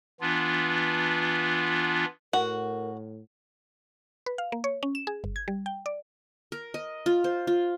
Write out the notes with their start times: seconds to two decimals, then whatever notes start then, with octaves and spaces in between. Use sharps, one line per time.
0.21 E3 B3 D4 F4
2.33 A2 F#4 A#4 F#5
4.26 B4
4.38 F5
4.52 A#3
4.64 C#5
4.83 C#4
4.95 E7
5.07 G#4
5.24 G1
5.36 G#6
5.48 G3
5.66 G5
5.86 D5
6.52 A#4
6.74 D#5
7.06 F4
7.24 C5
7.47 F4